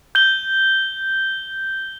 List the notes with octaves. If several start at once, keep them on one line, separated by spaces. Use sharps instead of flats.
G6 G7